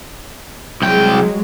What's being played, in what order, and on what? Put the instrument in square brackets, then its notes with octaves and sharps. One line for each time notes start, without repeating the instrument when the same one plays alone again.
[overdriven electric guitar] C2 G5 [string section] F#3 G#3